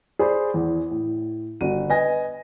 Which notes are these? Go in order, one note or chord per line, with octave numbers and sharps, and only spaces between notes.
G#4 C5 D5 B5
E2
A2
G1 F#4 D#7
B4 D#5 G#5 A#6